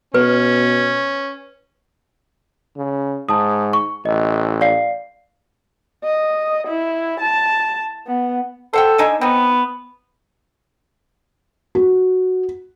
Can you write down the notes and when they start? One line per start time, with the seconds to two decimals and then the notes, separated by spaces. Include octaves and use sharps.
0.14 B2 C#4 B4
2.76 C#3
3.29 G#2 A5 D#6
3.73 C#6
4.05 A1 D#5
4.61 D5 F5 C7
6.04 D#5
6.68 E4
7.21 A5
8.07 B3
8.73 A4 C5 F#5 G5
8.98 D3 D#4 G#5
9.21 B3 C4 D#4
11.75 F#4